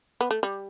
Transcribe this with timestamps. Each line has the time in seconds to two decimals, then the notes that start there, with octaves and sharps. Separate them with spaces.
0.21 B3
0.31 A3
0.43 G3